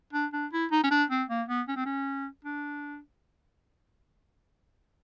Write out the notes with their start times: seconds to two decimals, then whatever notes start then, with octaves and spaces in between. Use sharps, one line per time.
0.13 D4
0.33 D4
0.52 E4
0.71 D#4
0.83 C#4
0.91 D4
1.10 C4
1.29 A#3
1.48 B3
1.68 C#4
1.76 C4
1.85 C#4
2.44 D4